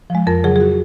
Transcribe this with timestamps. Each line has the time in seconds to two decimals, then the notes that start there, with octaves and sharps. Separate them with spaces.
0.10 F3 G#3
0.27 F2 A#4
0.44 C#3 F#3 G#4
0.56 G#4
0.61 F#4